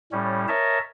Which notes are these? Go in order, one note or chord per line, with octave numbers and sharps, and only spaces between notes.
A2 G3 C#4
A#4 C#5 D#5 E5 A5